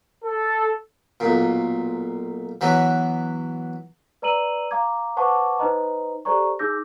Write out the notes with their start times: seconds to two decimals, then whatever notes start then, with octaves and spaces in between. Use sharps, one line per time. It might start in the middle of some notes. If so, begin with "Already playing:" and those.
0.23 A4
1.20 B1 A#2
2.61 E3 F#3 B3
4.22 B4 D5 A#5 E6 D#7 F#7
4.71 F5 A#5 D6 G#6
5.17 B4 C5 F#5 A5 C#6 D6
5.59 D#4 B4 C5 D#5 A#5
6.25 G4 A4 C5 D5 A#5 C#6
6.59 D#4 G#4 D6 E6 G6 A#6